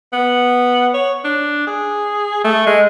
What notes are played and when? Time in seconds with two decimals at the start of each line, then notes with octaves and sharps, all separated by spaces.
0.13 B3
0.94 C#5
1.24 D4
1.67 G#4
2.44 A3
2.67 G#3